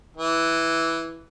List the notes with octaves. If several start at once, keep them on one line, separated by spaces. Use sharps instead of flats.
E3